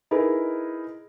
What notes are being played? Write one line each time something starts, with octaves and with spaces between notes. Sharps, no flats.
D#4 E4 G#4 A#4 B4